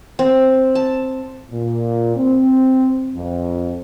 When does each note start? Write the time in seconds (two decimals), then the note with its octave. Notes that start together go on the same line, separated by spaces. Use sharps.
0.19 C4
0.75 A5
1.51 A#2
2.17 C4
3.15 F2